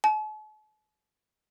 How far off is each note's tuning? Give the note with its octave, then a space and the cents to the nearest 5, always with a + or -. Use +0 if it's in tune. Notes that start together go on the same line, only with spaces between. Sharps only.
A5 -45